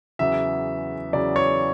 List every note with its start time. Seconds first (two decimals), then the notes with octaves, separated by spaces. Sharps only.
0.19 E2 C#3 F#3 E5
1.13 E2 C#3 F#3 D5
1.36 C#5